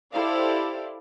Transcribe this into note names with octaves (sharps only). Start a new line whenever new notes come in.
E4 G4 A4 C5 D5 F5